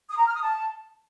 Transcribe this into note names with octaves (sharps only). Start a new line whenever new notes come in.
D#6
A#5
F6
D#6
A5